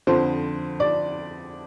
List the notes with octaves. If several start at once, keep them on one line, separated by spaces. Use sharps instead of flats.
F2 D3 F3 C5
D5